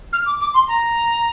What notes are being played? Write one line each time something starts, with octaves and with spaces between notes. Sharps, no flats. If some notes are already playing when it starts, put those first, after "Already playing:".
F6
D6
D6
C6
A#5